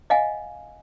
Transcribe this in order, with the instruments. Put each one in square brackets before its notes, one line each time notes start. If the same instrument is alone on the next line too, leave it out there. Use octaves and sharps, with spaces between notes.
[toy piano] D#5 F5 F#5 G#5